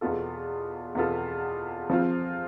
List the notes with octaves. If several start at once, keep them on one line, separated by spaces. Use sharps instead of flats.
E2 B2 B3 F4 A4
E2 B2 B3 F4 A4
F3 C4 F4